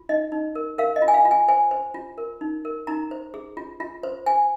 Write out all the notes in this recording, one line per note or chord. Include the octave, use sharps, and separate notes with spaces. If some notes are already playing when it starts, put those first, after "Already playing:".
Already playing: F4
D#4 D#5
D#4
A#4
A#4 F5
D#5
F4
G#5
F5
F4
G#5
C5 G#5
C5
F4
A#4
D#4
A#4
D#4 A#5
C5
G#4
F4
F4
C5
C5 G#5